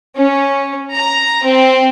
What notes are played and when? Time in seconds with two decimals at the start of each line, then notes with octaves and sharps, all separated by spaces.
0.18 C#4
0.93 A#5
1.45 C4